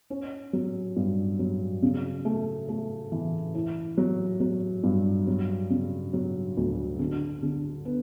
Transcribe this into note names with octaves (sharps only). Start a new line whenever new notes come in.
C#4
F#3
G2
F#3
C#3
A3
A3
E3
E4
F#3
F#3
G2
F#3
C#3
F#3
D2
D3
D3
B3